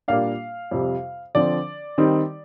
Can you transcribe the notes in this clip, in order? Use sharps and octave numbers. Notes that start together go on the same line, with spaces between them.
A#2 G3 A#3 D4 F5
F2 C3 G3
D3 F3 C4 D5
D#3 G3 C4 D#4